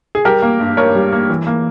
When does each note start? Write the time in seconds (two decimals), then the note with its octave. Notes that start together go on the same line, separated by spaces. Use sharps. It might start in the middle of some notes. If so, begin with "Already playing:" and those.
0.15 G#4
0.25 G3 G4 A#4
0.42 A#3
0.60 G2
0.77 G2 A#4 C#5
0.95 G3
1.12 A#3
1.30 E3
1.47 A#3